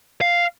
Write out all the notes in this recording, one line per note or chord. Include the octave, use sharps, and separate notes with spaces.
F5